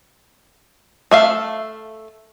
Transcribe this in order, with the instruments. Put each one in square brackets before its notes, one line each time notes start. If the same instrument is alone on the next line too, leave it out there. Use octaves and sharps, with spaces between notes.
[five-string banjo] A3 E5 F5